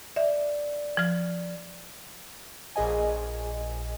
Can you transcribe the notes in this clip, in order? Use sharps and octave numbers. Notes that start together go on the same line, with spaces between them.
D5 E5
F3 F6
A#1 A#2 G#4 D#5 G#5